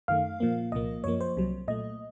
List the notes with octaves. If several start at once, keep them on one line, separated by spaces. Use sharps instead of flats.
F#2 D#3 A3 F5
A#2 F3 A#3
C2 A#2 F3 A#3 D#5
F#2 F3 A#3 C#5
C5
C2 C3 F#3
A#2 A3 D#5